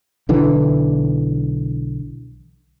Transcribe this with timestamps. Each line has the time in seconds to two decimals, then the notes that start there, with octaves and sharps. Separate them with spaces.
0.29 B1 D3 E3